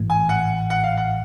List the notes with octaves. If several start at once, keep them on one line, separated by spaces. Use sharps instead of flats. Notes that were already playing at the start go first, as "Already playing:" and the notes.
Already playing: A1 G#2 E3 A3
G#5
F#5
F#5
F5
F#5